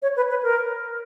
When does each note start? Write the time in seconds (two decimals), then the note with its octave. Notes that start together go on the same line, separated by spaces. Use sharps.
0.02 C#5
0.16 B4
0.30 B4
0.43 A#4